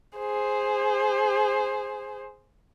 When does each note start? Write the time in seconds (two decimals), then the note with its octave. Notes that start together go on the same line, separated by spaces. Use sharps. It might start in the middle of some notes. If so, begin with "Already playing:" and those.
0.17 G#4 C5